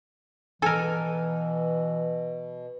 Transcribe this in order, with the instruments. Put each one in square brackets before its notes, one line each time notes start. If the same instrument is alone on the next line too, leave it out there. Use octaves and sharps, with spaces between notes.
[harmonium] B2 [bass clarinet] E3 [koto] A4 A#4 [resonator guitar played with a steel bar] G#5